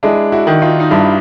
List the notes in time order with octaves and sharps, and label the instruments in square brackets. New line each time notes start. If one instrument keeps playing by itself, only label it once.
[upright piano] G#3 [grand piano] D4 E4
[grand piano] E4 F#4
[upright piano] D#3
[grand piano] D#4 F4
D#4
[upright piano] G2 [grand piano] D4 E4